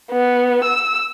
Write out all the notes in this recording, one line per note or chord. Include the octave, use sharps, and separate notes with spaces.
B3
E6